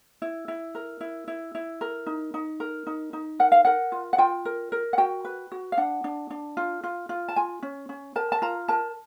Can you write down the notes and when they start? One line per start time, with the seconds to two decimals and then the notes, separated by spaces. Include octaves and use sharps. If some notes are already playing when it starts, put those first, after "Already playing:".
0.22 E4
0.48 E4
0.75 A#4
1.01 E4
1.28 E4
1.55 E4
1.81 A#4
2.07 D#4
2.34 D#4
2.60 A#4
2.87 D#4
3.13 D#4
3.39 A#4 F#5
3.52 F5
3.65 A#4 F#5
3.92 F4
4.13 F#5
4.18 F4 G5
4.45 A#4
4.72 A#4
4.93 F#5
4.98 F#4 G5
5.25 B4
5.52 F#4
5.72 F5
5.77 D4 F#5
6.04 D4
6.30 D4
6.57 F4
6.84 F4
7.09 F4
7.29 A5
7.36 F4 G#5
7.63 C#4
7.89 C#4
8.16 A#4 A5
8.32 A5
8.42 F4 A#5
8.68 A#4 A5